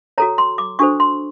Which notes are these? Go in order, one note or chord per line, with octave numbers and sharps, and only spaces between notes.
F#4 A4 C#5 A#5
C6
D6
D4 F#4 A4 C5 C#6
C6